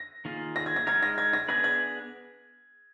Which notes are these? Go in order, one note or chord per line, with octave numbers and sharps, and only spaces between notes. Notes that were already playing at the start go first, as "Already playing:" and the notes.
Already playing: A#6
D#3 A#3 F4 G#4
A#6
G#6
A#6
G#3 D#4 A#4 G#6
A#6
G#6
A#6
B3 D4 G#4 B4 G#6
G#6